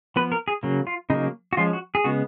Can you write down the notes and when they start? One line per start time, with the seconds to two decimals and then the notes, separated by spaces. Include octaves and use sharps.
0.16 F3 B3 B4
0.32 A#4
0.48 G#4
0.63 C#3 F#3 A#3
0.87 F4
1.10 C#3 F#3 A#3 D#4
1.53 F#4
1.57 F3 G#3 C#4 F4
1.73 F#4
1.95 G#4
2.04 C#3 G#3 B3 F#4